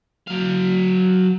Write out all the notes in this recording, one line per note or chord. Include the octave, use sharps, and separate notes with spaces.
F#3 F5